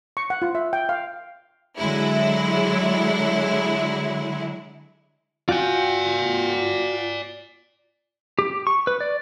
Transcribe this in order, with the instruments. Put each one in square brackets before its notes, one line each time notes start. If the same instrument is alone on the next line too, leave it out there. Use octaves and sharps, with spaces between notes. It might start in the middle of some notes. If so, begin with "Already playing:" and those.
[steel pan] C#6
F#5
F4
E5
G5
F5
[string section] D3 F#3 G#3 E4
[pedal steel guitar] F4 F#4 G5 [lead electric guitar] D5 G#5
[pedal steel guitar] G4
C#6
B4
D5